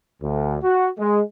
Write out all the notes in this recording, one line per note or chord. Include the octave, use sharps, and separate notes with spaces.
D2
F#4
G#3